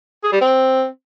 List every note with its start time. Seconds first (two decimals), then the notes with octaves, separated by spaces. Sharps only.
0.23 G#4
0.32 G3
0.41 C4